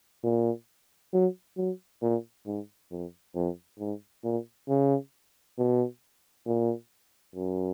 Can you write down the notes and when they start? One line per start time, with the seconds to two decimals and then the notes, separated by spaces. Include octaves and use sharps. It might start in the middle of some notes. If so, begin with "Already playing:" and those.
0.24 A#2
1.13 F#3
1.57 F#3
2.02 A#2
2.46 G#2
2.91 F2
3.35 F2
3.79 G#2
4.24 A#2
4.68 C#3
5.58 B2
6.46 A#2
7.35 F#2